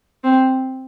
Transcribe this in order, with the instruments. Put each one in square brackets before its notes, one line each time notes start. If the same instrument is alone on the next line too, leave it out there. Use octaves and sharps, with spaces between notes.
[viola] C4